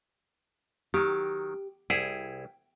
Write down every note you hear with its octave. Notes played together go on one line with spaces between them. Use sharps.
D#3 F#3 G4
C2 E4 G#4 G5